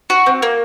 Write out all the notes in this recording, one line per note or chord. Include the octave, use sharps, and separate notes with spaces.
F#4
C4
A#3